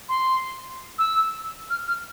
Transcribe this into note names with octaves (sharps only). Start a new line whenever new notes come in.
C6
E6
F6
F6